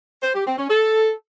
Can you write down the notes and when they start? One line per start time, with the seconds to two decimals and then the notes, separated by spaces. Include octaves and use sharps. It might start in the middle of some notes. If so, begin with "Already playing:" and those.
0.23 C5
0.35 G4
0.46 C4
0.58 C#4
0.70 A4